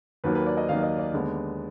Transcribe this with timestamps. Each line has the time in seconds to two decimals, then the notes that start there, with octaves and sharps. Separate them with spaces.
0.24 D#2 D#3 F#3 A#3 B4
0.35 B4
0.46 D5
0.57 D#5
0.69 D#2 D#3 F#3 A#3 F5
0.83 D#5
0.98 D5
1.13 D#2 D3 G#3 B3